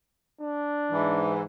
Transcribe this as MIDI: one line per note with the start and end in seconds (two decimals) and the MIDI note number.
0.41 1.37 62
0.92 1.41 44
0.92 1.41 52